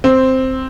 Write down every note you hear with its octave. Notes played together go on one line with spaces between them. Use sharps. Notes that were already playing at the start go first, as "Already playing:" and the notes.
C4